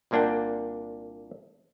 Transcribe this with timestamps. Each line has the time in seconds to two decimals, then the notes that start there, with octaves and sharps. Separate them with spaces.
0.11 C2 A#2 A#3 D4 F#5 G5